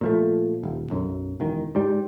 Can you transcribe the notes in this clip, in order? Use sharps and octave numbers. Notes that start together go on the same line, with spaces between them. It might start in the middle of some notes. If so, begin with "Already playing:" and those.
A#2 F3 A3
D#1
B1 F#2
E1 D#3
G#2 G3